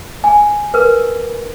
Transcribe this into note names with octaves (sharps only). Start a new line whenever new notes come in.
G#5
A#4 B4